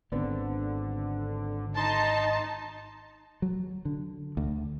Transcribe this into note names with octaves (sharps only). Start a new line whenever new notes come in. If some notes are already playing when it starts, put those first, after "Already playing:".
G#1 D3 B3 C4
D#4 A5 C6
F#3
D3
D2